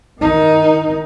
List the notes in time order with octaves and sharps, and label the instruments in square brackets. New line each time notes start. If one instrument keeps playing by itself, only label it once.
[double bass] D#3 D#4